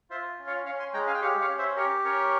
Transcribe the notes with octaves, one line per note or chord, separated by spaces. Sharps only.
F4 C5 E5
C#4
C#5 F5
C#4 C#5 F5
G#5 C6
G#3 G5 A#5
F5 G#5
G5
G4 C#5 F5
C#5 F5
C#4
C5 E5
G4 A#4 C#5
C#4 A#4 C#5